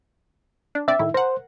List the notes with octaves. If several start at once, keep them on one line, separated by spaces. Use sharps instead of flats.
D4
C4 D4 D5 E5
A2 D#3 E4
A#4 C5 F#5